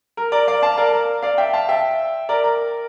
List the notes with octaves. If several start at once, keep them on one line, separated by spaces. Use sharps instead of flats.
A#4
A#4 D5
D5 F5
F5 A5
A#4 D5
A#4
D5 F5
E5 G5
F5 A5
E5 G5
A#4 D5
A#4